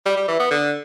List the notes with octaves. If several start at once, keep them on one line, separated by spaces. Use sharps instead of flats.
G3
G3
E3
B3
D3